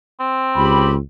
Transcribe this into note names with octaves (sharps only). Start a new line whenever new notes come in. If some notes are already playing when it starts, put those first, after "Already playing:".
C4
C#2 G4 B5